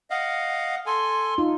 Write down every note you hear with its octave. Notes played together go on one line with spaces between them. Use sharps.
D#5 F5 F#5
A4 G#5 C6
D#4 F4